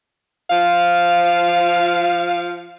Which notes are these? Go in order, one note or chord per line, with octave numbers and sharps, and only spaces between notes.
F3 F5